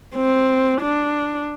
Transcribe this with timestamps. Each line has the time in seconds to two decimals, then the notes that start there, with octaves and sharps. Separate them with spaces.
0.15 C4
0.81 D4